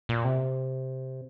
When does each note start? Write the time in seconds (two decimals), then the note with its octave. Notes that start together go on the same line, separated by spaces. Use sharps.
0.09 A#2
0.25 C3